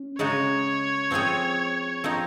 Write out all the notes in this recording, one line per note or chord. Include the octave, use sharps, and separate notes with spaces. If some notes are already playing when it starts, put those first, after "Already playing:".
Already playing: C#4
C#3 G#3 D#4 F#4 C#5
F3 C4 F4 G#4
F3 C4 D#4